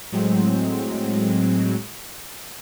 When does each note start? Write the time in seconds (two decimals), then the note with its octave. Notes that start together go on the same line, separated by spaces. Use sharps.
0.12 A2 F#3 G#3 C4